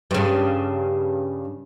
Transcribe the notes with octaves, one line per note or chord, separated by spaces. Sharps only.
G2 C#3